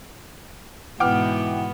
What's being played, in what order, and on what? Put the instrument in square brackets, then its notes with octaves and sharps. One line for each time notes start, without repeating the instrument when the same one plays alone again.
[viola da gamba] G#2 B2 B3 [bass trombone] E3 [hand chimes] F#5 [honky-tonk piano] G5 D6 F6